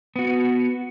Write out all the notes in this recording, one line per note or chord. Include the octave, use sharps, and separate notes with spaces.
B3 F#4